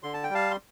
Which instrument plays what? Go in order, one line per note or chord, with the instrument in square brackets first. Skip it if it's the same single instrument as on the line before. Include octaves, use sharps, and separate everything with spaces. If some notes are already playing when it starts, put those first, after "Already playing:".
[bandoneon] D3 C6
A5
G5
G3 F5 A5
C6